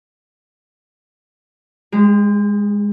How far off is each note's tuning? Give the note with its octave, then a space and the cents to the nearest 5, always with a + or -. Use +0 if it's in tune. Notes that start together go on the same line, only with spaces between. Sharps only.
G#3 -15 G4 +40